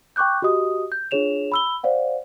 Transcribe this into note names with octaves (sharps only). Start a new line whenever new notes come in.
G5 C#6 D6 F#6 G6
F#4 G4 D#5 D#6
G6
D4 F4 G#4 C#5 E7 F7
B5 E6 G7
C5 D5 F5 F#5